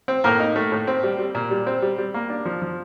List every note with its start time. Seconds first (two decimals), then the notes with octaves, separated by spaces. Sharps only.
0.08 C4
0.24 A2 A#3 A#4
0.40 D#4
0.56 A3
0.72 A2
0.87 C4
1.03 G3
1.19 G3
1.35 A#2
1.51 G3
1.67 C4
1.82 G3
1.98 G3
2.14 A#3
2.30 D4
2.46 F3
2.62 F3